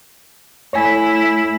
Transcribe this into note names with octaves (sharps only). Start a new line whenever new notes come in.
A3 E4 C#5 G#5